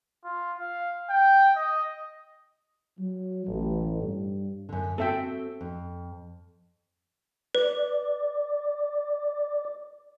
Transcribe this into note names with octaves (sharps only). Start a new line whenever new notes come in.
F4
F5
G5
D#5
F#3
A1
G2
F#2 D3
C4 F#4 A4 E5 G5
F2
B4 D5